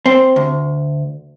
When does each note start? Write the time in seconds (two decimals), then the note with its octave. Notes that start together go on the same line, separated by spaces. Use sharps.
0.06 C4
0.36 D2